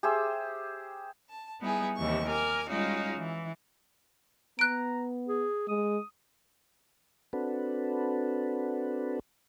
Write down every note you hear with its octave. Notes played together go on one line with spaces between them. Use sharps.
G4 G#4 C5 E5
A5
G3 B3 D#4 E4 G#4
D#2 C3 E3 C#6
A#4 G#5 D6 F6
G3 G#3 C#4 D#4 F4 F#4
E3
B3 A#5 F#6 D7
G#4
G#3 D#6
C4 D4 F#4 A4 B4